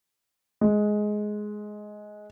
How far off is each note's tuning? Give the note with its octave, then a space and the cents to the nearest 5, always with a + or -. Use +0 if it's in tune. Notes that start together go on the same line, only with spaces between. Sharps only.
G#3 +10